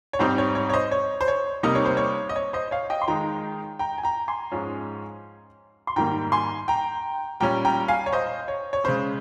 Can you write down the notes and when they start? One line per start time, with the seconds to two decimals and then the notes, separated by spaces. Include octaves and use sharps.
0.13 C#5
0.19 G#2 G3 C4 D#4 C5
0.38 C#5
0.55 C#5
0.69 C#5
0.73 C5 D#5
0.92 C#5
1.21 C5
1.28 C#5
1.63 C3 G3 A#3 D#4 D#5
1.75 C#5
1.85 C5
1.97 C#5
2.29 D#5
2.36 C#5
2.53 C5 D#5
2.71 C#5 F5
2.90 D#5 G5
3.02 C6
3.08 D#3 G#3 D#4 G5 A#5
3.79 G5 A#5
3.98 G#5
4.03 G5 A#5
4.28 G#5 C6
4.52 G#2 F3 G#3 C#4
5.87 C6
5.96 G#2 D#3 G3 A#3 G5 A#5
6.32 G#5 C6
6.68 G5 A#5
7.40 A#2 G3 C#4 G5 A#5
7.65 G5 A#5
7.88 F5 G#5
8.06 C#5
8.13 C5 D#5
8.48 C#5
8.73 C#5
8.84 C#3 G#3 C#4 C5